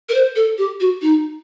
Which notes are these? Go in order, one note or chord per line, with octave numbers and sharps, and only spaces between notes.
A#4
C5
A4
G4
F#4
D#4